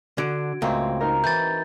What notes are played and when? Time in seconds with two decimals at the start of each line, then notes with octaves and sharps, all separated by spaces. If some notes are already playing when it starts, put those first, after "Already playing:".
0.18 D3 F#4 G#6 D7
0.62 C#2 A2 A#3 C4
1.00 D#4 A#4 A#5
1.24 E3 G6 A6